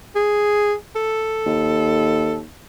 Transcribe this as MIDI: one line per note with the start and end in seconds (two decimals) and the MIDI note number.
0.15 0.74 68
0.96 2.38 69
1.46 2.44 39